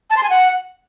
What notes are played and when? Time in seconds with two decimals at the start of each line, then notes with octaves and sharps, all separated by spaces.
0.10 A5
0.17 C6
0.23 G#5
0.30 F#5